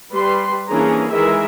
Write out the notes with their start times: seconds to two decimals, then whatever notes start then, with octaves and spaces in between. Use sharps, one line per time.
0.11 G3 B4 C6
0.68 E3 A#3 C#4 D4 G#4 A#5
1.12 D#3 E3 G#3 G#4 A#4 E5